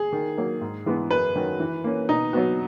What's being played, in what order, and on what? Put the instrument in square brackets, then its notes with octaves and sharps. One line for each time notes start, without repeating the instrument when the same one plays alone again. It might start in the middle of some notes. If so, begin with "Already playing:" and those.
Already playing: [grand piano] G#4
[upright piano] D#3
F#3 A#3
G#2
E3 G#3 B3
[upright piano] F#2 [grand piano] B4
[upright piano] D#3 F#3 C#4 F#4
E3
A#3 C#4
[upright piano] B2 [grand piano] D#4
[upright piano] F#3 B3 F#4